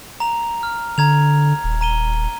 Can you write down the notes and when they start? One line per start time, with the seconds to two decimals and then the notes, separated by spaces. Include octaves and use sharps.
0.20 A#5 F7
0.63 F6
0.98 D3 A#5 G#6 F7
1.64 D#1
1.81 A#5 D#7 G7